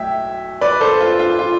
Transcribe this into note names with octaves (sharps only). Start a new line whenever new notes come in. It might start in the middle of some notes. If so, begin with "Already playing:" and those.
Already playing: B1 A2 E5 G5
B4 D5
A4 C5
F4
F4
F4